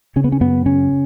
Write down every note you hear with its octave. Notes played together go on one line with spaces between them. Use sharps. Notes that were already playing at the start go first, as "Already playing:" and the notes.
C#3 C#4
B3
C#4
F#2 B3
C#3 C#4